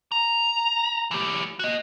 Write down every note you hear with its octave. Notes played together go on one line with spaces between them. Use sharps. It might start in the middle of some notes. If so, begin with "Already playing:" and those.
A#5
E3 G4
F#4 D#5